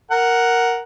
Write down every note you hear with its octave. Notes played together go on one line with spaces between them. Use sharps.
A#4 F#5